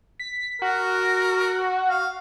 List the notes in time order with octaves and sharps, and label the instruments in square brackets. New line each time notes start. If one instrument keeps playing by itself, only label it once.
[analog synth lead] B6
[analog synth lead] F#4 [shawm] A#4
[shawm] F5